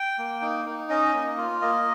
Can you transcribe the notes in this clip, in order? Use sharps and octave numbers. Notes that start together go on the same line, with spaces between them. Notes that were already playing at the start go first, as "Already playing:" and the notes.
Already playing: G5
A#3
D#4
D#4
C#4 D#5
A#3
F4
A#3 D#5